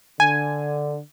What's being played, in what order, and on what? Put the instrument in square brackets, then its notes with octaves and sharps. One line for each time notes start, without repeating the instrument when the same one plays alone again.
[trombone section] D3 [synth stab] G#5